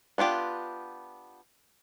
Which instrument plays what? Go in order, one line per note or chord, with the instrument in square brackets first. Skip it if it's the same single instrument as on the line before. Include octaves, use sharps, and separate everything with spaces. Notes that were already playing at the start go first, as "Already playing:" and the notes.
[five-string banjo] B3 D4 F4 G4